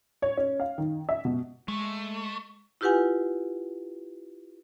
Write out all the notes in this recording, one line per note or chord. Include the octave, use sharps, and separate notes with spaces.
C#5
C#4
F5
D#3
E5
B2
G#3 A3
E4 F4 G4 B4 F#5 G#5